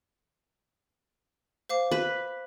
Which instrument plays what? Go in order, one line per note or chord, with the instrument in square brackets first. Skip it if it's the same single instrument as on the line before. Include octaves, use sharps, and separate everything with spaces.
[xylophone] C5 F5 D6
[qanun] B4